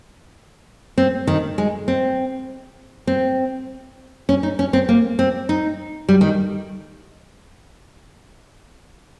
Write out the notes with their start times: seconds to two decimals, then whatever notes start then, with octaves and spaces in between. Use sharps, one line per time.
0.98 C4
1.27 D#3
1.58 G#3
1.88 C4
3.07 C4
4.29 C#4
4.43 D#4
4.59 C#4
4.73 C4
4.89 A#3
5.19 C4
5.49 D#4
6.09 G3
6.21 D#3